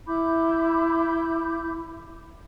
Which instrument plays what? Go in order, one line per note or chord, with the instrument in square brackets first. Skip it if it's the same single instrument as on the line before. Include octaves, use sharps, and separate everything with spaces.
[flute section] E4 B5 D6 G6